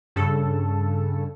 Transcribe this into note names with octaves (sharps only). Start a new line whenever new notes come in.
G2 C#3 A4